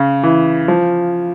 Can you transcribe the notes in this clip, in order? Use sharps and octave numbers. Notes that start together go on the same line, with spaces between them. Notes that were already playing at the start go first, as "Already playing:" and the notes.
Already playing: C#3
E3
F3